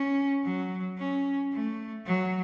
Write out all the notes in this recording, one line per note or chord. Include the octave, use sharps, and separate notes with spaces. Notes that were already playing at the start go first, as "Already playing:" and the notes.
Already playing: C#4
F#3
C#4
A3
F#3